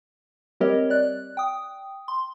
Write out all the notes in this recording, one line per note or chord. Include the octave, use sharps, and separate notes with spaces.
G3 C4 G4 A#4 C#5 D#5
D5 F#6
G5 D#6
C6